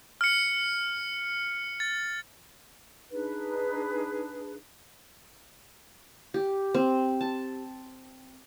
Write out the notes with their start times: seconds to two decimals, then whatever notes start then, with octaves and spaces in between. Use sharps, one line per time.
0.21 F6 C#7
1.80 A6
3.12 D4 D#4 G#4 B4
6.34 G4
6.75 C4
7.21 A5